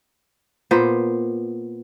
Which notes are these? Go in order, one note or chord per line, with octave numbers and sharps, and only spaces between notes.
A#2 B3 C5